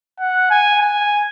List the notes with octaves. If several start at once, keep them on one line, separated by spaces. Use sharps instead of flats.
F#5
G#5
G#5